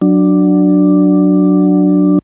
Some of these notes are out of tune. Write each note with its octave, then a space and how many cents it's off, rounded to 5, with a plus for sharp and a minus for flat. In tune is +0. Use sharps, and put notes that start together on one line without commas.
F#3 +0 D4 +5